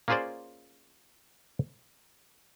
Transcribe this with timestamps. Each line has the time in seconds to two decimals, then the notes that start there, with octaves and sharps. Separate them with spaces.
0.08 A#3 C#4 F4 G#4 C5 D5